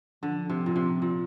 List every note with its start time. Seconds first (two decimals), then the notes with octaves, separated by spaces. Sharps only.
0.23 D3 F3
0.50 C3
0.66 A#2
0.76 C3
1.02 A#2